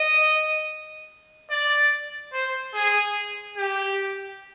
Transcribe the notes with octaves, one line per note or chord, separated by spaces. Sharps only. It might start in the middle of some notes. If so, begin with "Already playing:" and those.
Already playing: D#5
D5
C5
G#4
G4